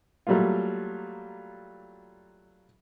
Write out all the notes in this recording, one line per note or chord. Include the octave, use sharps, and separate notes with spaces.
F#3 G3 A3 A#3 F4